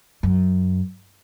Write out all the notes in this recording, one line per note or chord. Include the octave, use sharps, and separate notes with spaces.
F#2